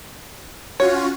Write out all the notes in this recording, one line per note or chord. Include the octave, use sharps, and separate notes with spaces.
C#4 F4 F#4 C#5